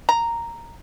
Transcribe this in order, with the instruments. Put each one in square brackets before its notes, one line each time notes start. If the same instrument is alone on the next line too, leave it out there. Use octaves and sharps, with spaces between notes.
[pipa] A#5